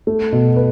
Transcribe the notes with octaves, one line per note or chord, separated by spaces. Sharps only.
A3
B2
B4